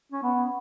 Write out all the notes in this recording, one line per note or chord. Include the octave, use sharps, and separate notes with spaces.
C#4
B3